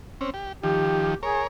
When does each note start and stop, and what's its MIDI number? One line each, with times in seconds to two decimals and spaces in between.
0.21 0.30 60
0.21 0.30 61
0.34 0.53 67
0.63 1.15 51
0.63 1.15 53
0.63 1.14 67
1.23 1.42 68
1.23 1.47 70
1.23 1.47 73